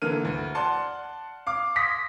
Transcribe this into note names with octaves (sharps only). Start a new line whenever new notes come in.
D3 E3 A#3 A4 F6 D#7
D2
D5 F#5 A5 C6
F5 D6
C6 D#6 A#6 B6